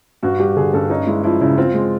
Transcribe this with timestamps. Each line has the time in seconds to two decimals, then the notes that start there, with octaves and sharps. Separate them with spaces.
0.23 G2 F#4
0.39 G3 G4
0.56 D3 G#4
0.73 G2 A4
0.90 C#4 D#4
1.07 G#3 E4
1.24 F3 E4
1.41 C#3 E4
1.58 C4 F4
1.74 G#3